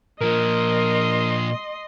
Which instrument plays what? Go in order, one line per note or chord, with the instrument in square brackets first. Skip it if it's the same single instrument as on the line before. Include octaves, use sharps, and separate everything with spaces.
[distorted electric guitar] A#2 F3 [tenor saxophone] A#4 [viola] D#5 C6